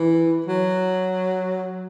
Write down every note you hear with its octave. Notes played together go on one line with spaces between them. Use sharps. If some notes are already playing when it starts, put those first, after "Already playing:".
Already playing: E3
F#3